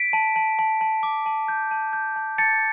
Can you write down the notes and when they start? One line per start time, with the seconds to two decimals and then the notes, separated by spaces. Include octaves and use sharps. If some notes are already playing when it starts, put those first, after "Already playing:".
Already playing: B6 D7
0.13 A5
0.36 A5
0.59 A5
0.81 A5
1.03 D6
1.26 A5
1.48 G6
1.71 A5
1.93 G6
2.16 A5
2.38 A5 A6 C#7